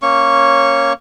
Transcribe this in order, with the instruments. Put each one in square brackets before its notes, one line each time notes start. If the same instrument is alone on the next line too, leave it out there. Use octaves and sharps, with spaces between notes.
[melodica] A#3 C#4 C#5 C#6